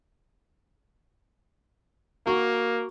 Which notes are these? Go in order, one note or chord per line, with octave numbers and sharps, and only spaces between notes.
A#3 F#4 C#6